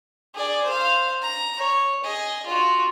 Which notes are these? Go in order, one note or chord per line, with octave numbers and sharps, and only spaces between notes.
G#4 D5
C5 F5
A#5
C#5
G#4 D#5
F4 F#4